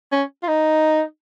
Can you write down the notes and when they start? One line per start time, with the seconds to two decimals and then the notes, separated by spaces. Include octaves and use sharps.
0.12 C#4
0.43 F4
0.48 D#4